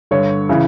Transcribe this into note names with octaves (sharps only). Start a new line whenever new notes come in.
G2 D3 C#5
C#3 E3